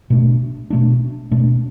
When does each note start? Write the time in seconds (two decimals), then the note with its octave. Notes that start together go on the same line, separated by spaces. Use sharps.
0.10 B2 A3 D4
0.70 B2 A3 D4
1.31 B2 A3 D4